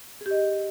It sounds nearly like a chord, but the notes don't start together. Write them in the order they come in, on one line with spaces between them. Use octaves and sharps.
G#4 G4 D#5